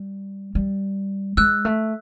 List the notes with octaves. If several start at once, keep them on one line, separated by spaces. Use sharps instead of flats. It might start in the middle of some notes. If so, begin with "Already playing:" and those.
Already playing: G3
G3
G#3 E6 F#6
A3